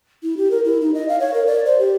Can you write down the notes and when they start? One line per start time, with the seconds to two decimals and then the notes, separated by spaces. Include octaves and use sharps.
0.23 E4
0.37 G4
0.51 A#4
0.65 E4
0.81 D#4
0.94 D#5
1.08 F5
1.20 C#5
1.34 A#4
1.47 D5
1.66 C5
1.79 G4